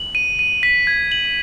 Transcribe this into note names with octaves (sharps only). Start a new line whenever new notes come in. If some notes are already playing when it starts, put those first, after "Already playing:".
Already playing: F#7
D#7
D#7
B6
G#6
F#7